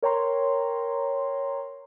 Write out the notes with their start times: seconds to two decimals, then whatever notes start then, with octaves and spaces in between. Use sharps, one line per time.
0.03 A#4 C#5 G5 A#5 C6